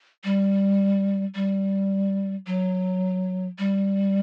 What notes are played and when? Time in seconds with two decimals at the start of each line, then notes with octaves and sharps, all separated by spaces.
0.24 G3
1.35 G3
2.47 F#3
3.59 G3